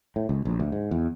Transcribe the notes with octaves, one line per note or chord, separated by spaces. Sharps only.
A2
C#2
A#1
D2
G#2
E2